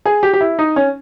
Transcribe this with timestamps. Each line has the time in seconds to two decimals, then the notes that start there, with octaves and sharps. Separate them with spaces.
0.06 G#4
0.23 G4
0.33 G4
0.41 E4
0.59 D#4
0.76 C#4